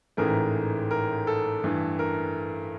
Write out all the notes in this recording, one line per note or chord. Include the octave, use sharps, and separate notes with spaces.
A1 G#2 E3 A3 A#4
A#4
A4
G2 E3 A3
A#4